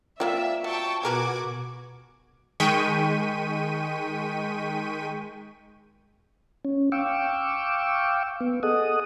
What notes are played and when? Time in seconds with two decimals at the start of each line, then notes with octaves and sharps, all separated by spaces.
0.20 F3 A#3 C4 F4 D5 E5
0.64 F#3 G5 A5 C#6
1.03 B2 F#4 G#4 A#4 B4 D6 G#6
2.60 D#3 G#3 G5 C#6 B6 D#7
6.65 C#4
6.92 F5 G5 C#6 D6 E6
8.41 B3
8.63 G#4 A4 D#5 F#5 D#6